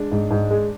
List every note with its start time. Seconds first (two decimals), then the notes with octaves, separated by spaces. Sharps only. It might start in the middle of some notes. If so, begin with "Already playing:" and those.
Already playing: G#3 D4
0.12 G#2
0.31 G#2
0.51 G#3